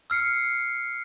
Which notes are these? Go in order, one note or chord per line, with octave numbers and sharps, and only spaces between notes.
E6 F6 C7 C#7